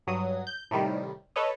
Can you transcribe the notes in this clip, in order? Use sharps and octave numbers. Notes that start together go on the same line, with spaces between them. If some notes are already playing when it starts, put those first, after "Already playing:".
G2 F#3 D#6
G6
A2 C3 D#3 G3
A4 B4 C#5 D#5